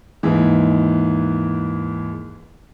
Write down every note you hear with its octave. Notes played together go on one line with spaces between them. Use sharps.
D#2 G#2 E3